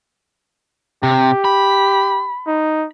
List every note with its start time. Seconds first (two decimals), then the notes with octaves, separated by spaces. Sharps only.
1.03 C3 G4
1.45 B5
2.47 D#4